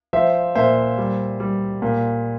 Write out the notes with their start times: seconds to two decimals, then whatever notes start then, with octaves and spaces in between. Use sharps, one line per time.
0.13 F3 C5 E5
0.55 A#2 C5 E5
0.98 G3
1.40 G3
1.82 A#2